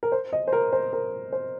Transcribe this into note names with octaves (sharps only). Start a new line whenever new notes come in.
A#4
C5
D#5
C5
A#4
C5
A#4
C5